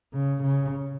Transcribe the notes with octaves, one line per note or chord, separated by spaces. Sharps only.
C#3
C#3